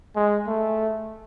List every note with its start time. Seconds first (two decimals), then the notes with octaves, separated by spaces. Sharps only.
0.16 G#3
0.47 A3